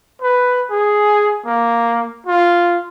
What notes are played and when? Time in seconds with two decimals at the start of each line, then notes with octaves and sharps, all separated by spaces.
0.22 B4
0.70 G#4
1.45 A#3
2.26 F4